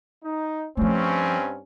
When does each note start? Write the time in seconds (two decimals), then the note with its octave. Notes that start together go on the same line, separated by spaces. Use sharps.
0.24 D#4
0.77 G2 F3 A3 C4 C#4